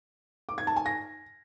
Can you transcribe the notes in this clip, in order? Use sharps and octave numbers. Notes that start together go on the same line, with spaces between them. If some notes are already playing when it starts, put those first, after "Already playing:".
D6
G#6
A5
G#5
A#6